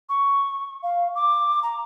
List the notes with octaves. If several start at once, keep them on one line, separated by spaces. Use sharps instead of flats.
C#6
F5
D6
A#5